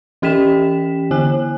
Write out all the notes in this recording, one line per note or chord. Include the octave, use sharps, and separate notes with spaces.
E3 C#4 G4 G5 B6 E7
D3 E4 G#5 F#6